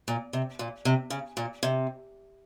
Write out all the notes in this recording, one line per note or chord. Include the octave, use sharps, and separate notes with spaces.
A#2
C3
A#2
C3
C#3
A#2
C3